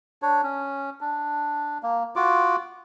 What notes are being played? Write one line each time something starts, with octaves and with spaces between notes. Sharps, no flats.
D4 C#5
C#4
D4
A#3
F4 F#4 D6